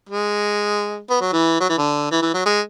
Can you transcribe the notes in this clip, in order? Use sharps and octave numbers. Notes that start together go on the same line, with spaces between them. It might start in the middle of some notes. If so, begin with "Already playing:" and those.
G#3
B3
F#3
E3
F#3
E3
D3
E3
E3
F#3
G#3